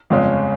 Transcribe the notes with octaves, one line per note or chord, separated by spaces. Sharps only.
G1 F2 C#3 G#3 C#4